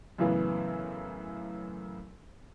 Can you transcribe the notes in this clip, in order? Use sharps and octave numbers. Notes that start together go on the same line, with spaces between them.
F#2 A2 C#3 E3 B3